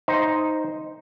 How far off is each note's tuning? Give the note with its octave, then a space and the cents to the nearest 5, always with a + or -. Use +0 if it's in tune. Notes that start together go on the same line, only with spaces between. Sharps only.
D#4 +0 C5 +0